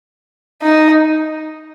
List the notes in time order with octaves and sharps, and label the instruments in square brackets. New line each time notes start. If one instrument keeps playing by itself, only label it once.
[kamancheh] D#4